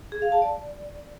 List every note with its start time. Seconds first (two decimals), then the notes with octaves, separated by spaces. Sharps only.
0.12 G#4
0.22 F5
0.32 A5
0.42 D5